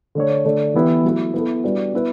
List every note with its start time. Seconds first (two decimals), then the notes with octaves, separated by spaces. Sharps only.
0.15 D3 A3 D4 A4 C#5
0.45 D3 A3 D4
0.74 E3 B3 E4 G4 B4
1.04 F#3 A3 E4
1.34 B3 E4 A4
1.64 G3 D4 F#4 B4
1.93 B3 E4 B4